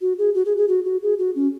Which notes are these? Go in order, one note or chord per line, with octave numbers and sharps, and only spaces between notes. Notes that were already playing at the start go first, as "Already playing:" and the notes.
F#4
G#4
F#4
G#4
G#4
F#4
F#4
G#4
F#4
C#4